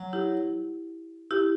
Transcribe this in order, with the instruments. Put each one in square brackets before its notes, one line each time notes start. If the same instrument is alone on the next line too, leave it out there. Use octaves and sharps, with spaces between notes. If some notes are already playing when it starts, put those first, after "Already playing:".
Already playing: [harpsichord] F#3
[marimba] E4 G4
E4 G4